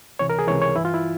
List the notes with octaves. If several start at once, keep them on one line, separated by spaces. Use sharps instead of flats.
C#2 C3 E3 C#5
A#4
G#4
C#2 C3 E3 C#5
C#5
G2 E3 E4
F4
E4